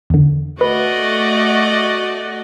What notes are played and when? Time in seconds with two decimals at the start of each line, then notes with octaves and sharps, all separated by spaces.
0.10 E2 D3
0.61 A3 F#4 B4 D5 D#5